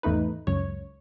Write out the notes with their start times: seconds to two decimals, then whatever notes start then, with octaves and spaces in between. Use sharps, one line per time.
0.03 G#1 E2 A3 D#4 B4
0.47 C#2 F#2 C#5